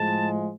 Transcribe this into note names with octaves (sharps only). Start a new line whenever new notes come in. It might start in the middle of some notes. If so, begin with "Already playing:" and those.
Already playing: A2 F3 G#3 A5